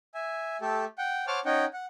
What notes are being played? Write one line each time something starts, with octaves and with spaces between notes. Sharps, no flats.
E5 G#5
A3 G4 A4
F#5 G5
C5 C#5 F#5 A5 D6 F6
C#4 D#4 F#5 G5
F#5